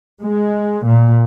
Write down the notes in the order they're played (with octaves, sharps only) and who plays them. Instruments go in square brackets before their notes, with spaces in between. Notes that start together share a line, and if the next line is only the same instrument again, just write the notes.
[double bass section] G#3
A#2